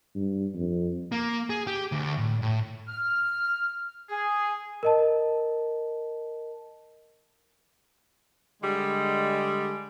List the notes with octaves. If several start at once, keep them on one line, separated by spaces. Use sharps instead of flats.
G2
F2
A#3
G#4
G4
D2
A2
A2
F6
G#4
A#4 D#5 A5
D3 G3 G#3